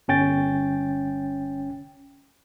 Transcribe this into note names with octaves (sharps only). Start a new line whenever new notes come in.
G1 C#4 G5 A6